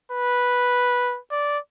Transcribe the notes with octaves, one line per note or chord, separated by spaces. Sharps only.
B4
D5